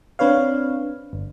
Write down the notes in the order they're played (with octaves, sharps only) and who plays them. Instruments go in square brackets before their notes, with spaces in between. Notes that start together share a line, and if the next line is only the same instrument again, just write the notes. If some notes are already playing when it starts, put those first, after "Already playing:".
[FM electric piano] C4 D4 B4 C#5 F5
G1